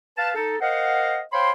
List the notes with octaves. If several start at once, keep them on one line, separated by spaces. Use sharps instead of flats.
B4 F5 A5
D#4 A4
A#4 C5 D#5 F5 F#5
C5 C#5 F5 G5 B5 C6